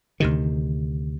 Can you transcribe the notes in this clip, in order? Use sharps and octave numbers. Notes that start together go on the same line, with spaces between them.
D2 C3 D#3